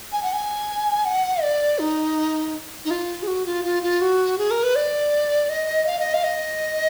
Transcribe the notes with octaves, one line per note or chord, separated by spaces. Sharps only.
G#5
F#5
G#5
F#5
D5
D#4
D#4
F4
G#4
F#4
F4
F4
F4
F#4
G#4
A#4
B4
D5
D#5
F5
D#5
F5
D#5